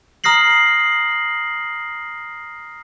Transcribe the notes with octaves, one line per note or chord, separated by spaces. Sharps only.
A#5 D#6 F6 A#6 C7 F#7